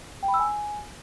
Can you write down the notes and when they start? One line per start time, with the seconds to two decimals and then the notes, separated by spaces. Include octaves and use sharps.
0.23 G5
0.28 B5
0.34 E6
0.39 G#5